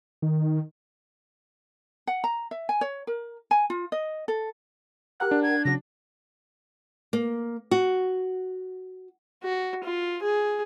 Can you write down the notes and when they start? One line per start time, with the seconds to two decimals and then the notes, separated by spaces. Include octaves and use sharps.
0.22 D#3
2.07 F#5
2.24 A#5
2.51 E5
2.69 G#5
2.81 C#5
3.07 A#4
3.51 G#5
3.70 F4
3.92 D#5
4.28 A4
5.20 G4 A#4 F#5 F#6
5.31 D4
5.43 G#6
5.65 C#3 F#3 A#6
7.13 A#3
7.71 F#4
9.44 F#4
9.84 F4
10.22 G#4